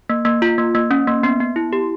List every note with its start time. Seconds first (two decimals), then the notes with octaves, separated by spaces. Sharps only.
0.10 A#3
0.25 A#3
0.42 F4
0.58 A#3
0.75 A#3
0.91 C#4
1.07 A#3
1.23 B3
1.40 B3
1.56 E4
1.73 G4